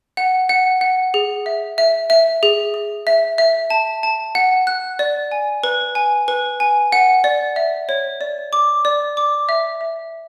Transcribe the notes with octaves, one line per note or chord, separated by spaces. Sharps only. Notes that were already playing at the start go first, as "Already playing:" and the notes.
F#5
F#5
F#5
G#4
E5
E5
E5
G#4
G#4
E5
E5
A5
A5
F#5
F#6
D5
G#5
B4
G#5
B4
G#5
F#5
D5
E5
C#5
D5
D6
D5
D6
E5
E5